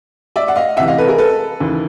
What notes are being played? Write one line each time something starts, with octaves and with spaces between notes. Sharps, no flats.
D5 E5
F#5
D#5 F5
C#2 C3 E3 E5 F#5
D#5 F5
A4 B4
G#4 A#4
A4 B4
D#2 C#3 E3